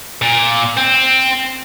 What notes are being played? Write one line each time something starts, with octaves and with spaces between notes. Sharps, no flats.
A#2
C4